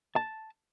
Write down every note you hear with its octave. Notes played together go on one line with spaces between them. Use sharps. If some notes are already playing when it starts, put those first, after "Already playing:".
A5